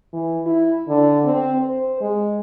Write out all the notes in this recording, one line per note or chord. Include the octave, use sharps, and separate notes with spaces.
E3
E4
D3
C4
C5
G#3